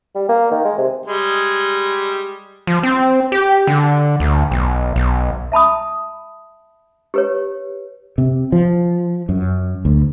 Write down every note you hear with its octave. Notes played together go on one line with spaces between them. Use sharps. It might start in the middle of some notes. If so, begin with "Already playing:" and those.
G3
A#3
D#3
G#3
C3
G3 G#3
F3
C4
G4
D3
D2
B1
B1
E5 A5 B5 D#6
G4 B4 C#5
C3
F3
F#2
D2